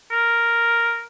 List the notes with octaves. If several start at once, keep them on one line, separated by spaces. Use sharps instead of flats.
A#4